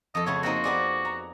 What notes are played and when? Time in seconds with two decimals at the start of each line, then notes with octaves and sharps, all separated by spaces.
0.15 F2 A4 D#5
0.26 C#3 A3 B3 C#5
0.43 A#3 C4 D#4 F#4
0.64 B3 G#4 D5
1.05 A#5